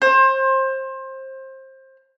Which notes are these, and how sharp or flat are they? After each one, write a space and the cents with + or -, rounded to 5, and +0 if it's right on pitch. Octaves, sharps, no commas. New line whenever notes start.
C5 +25